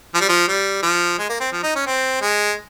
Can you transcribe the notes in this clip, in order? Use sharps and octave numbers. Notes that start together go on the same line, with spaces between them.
F3
G3
F3
G3
F3
G#3
A#3
C4
F3
D#4
C#4
C4
G#3